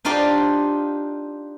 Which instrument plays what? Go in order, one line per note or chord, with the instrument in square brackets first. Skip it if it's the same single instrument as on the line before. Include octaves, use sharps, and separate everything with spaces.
[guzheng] D4 D#4 F4 G4 C5 D5